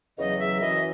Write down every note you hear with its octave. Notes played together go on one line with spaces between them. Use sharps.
E2 C#3 F#3 D#5
E5
F#2 E3 D#5